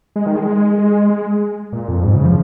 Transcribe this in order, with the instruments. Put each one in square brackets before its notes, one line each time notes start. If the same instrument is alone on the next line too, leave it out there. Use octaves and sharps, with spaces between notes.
[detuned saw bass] G#3
D#3
G#3
G#3
G#3
G#3
A#2
F2
G#2
C#3
F3